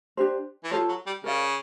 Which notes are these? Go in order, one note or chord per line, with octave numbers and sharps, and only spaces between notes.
D4 G4 C5
E3
F3 F4 A4 C#5
F#3
G3
C#3 A#4 D5 F5